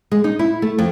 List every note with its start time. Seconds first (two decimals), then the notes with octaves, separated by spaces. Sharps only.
0.12 G#3
0.24 D#4
0.39 E4
0.62 A3
0.78 F2